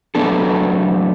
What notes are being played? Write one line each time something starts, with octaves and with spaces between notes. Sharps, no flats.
B2 F#3 A3 B3 D4 A4